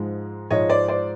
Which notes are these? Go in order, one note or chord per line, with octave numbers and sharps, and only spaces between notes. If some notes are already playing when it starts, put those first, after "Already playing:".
Already playing: G#2 F3 G#3
G#2 F3 G#3 C#5 D#5
C5 D5
C5 D5